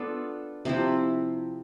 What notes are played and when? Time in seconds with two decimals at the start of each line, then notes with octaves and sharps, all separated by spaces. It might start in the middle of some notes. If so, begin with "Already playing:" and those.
Already playing: B3 D4 F4 A4
0.65 C3 F3 C4 E4